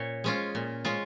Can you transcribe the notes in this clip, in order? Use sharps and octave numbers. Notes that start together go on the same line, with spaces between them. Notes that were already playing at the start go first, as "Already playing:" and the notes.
Already playing: A#2 C#4 C#5
G#3 C#4 F4
A#2
G#3 C#4 F4